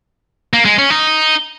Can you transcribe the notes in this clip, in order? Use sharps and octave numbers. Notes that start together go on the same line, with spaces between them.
A#3
G#3
C#4
D#4